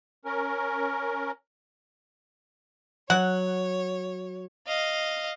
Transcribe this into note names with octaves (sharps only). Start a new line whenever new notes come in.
C#4 A#4
F#3 C#5 F#5
D#5 F5